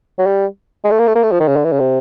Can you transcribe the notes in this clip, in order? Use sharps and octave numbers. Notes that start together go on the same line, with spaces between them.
F#3
G3
G#3
A3
A#3
A3
A#3
A3
F3
D#3
C#3
D3
E3
C#3
C3